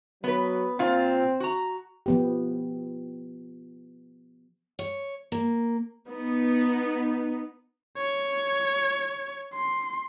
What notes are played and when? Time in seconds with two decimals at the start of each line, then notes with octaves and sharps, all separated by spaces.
0.24 F#3 B3 B4
0.79 A#2 C4 F4
1.40 F#4 A#5
2.06 F3 B3 G4
4.79 C#5
5.32 A#3
6.08 B3 D#4
7.97 C#5
9.54 C6